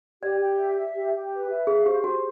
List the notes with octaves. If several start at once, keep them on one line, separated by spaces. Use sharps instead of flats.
G4 D5
G4
E5
E5
G4
G4
B4
E5
G#4 F5
G4 C5
F#4 C5